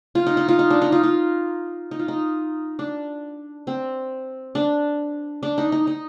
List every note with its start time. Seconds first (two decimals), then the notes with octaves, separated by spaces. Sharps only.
0.15 F4
0.27 D#4
0.37 D#4
0.48 F4
0.59 D#4
0.70 D4
0.82 D#4
0.92 F4
1.03 F4
1.91 D#4
1.99 F4
2.08 D#4
2.79 D4
3.67 C4
4.55 D4
5.43 D4
5.58 D#4
5.72 D#4
5.87 D#4